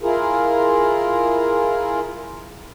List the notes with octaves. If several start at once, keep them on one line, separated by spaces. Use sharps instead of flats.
E4 F4 G#4 A#4